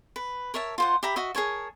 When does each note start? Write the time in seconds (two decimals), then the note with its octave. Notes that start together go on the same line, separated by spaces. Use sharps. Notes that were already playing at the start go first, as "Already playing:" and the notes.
0.16 B4
0.54 A#4 C#5 E5 A5
0.78 F4 C5 F#5
1.03 G4 E5 A#5 B5
1.16 F#4 D#5 E5
1.35 G#4 A#4 C#5 A5